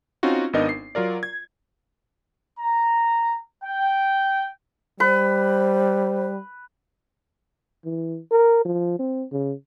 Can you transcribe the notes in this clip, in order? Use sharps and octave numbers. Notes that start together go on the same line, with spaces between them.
C4 C#4 D#4 F4 F#4
G#1 B3 D4 D#4 A#4 D#5
C7
F#3 F4 A#4 D5
G#6
A#5
G5
G3 B4 C5
E3
A#4
F3
C4
C#3